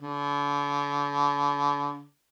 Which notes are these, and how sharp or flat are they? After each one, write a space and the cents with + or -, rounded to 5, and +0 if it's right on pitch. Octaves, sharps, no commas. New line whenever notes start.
D3 -40